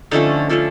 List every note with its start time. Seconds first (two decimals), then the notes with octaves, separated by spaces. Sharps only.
0.11 D3 F3 A3 C#4 D#4
0.49 D3 F3 A3 C#4